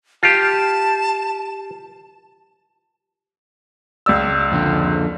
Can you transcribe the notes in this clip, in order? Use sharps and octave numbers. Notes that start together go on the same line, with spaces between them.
F4 G4 A5
C#2 D5 E6
F2 D3